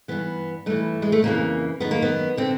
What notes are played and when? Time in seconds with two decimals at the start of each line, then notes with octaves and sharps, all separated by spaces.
0.08 G2 E3 B3
0.66 G2 E3 A3
1.02 G#3
1.12 A3
1.23 F2 C#3 E3 A#3
1.80 F#2 D#3 B3
1.91 A#3
2.02 B3
2.37 D3 C4